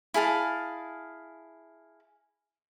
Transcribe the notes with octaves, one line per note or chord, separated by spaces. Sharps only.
E4 G#4 F5 A5